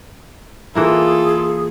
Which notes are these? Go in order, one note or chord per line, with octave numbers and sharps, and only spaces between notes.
E3 A#3 E4 F4 G#4 A4